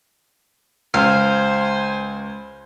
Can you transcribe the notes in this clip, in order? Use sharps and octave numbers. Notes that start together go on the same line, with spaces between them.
C#2 C5 F5 G#5